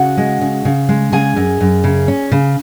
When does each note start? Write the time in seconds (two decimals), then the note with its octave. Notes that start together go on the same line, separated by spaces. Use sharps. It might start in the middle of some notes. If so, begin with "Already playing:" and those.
Already playing: C#3 F#4 F#5
0.17 G#3
0.41 C#3
0.65 C#3
0.89 G#3
1.12 C#3 G#4 G#5
1.36 F#2
1.61 F#2
1.84 C#3
2.08 C#4
2.32 C#3